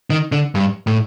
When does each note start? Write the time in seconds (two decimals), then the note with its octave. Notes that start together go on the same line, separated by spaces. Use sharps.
0.10 D#3
0.32 D3
0.55 G2
0.87 A2